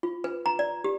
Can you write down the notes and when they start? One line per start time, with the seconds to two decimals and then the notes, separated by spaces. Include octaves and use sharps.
0.03 F4
0.24 B4
0.46 A#5
0.59 D5
0.84 G4